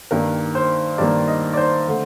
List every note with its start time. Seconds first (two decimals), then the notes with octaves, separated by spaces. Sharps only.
0.11 G2 D#3 G3 A#3 A#4
0.55 C5
0.98 G2 D#3 G3 A#3 D5
1.28 D#5
1.54 D5
1.57 C5
1.88 D3 A3